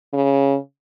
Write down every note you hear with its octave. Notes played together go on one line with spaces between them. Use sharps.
C#3